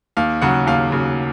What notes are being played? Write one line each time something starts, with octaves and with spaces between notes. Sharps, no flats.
D#2 F5
C#3 F#3 F#5
D#2 F5
C#3 F#3